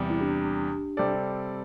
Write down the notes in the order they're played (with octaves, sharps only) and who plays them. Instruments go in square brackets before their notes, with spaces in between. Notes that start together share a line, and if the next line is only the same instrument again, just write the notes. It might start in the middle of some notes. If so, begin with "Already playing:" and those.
Already playing: [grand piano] E2 C3 G3
[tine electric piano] E4
D4 G4
[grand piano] C3 G3 C4 A4 D5